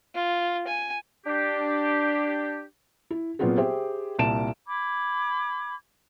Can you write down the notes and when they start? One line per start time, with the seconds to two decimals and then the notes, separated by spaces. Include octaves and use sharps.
0.15 F4
0.67 G#5
1.26 D4 G4
3.11 E4
3.39 A#2 F#3 B3 C4 F4 G#4
3.57 G4 G#4 C5 E5 G5
4.19 C2 A#2 A5 D7 E7
4.67 B5 D6 G#6